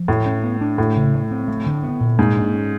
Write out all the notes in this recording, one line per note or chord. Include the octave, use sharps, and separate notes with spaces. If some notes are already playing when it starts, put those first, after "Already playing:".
Already playing: F3
A2 A3
C#4
B3
D4
A2 A3
C#3
A3
C4
A3
D3
B3
A#2
G#2 A#3
D4
C#4